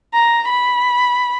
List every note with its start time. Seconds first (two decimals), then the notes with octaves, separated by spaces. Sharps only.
0.14 A#5
0.50 B5